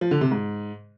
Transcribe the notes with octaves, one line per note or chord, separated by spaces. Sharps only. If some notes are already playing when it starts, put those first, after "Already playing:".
F3
D3
C3
G#2